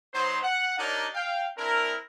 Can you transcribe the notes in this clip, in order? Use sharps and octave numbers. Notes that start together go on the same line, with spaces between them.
F#3 B3 D#4 C5
F#5
D4 D#4 G4 A#4 C#5 D5
F5 G5
C4 D4 E4 A#4